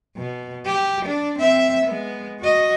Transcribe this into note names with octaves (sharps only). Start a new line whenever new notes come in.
B2
G4
D4
C4 E5
G#3 B3
F#4 D#5